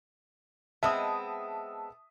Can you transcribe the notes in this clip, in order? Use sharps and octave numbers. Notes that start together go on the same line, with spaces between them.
G#3 B3 C4 E5 A5 D#6